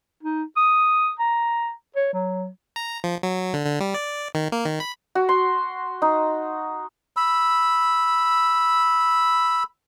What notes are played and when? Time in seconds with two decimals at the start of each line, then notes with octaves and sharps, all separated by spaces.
0.23 D#4
0.56 D#6
1.19 A#5
1.96 C#5
2.13 F#3
2.76 A#5
3.04 F3
3.23 F#3
3.53 D3
3.66 D3
3.80 G3
3.94 D5
4.35 D#3
4.52 A#3
4.65 D#3
4.80 B5
5.15 F#4
5.29 C6
6.02 D#4
7.17 B5 E6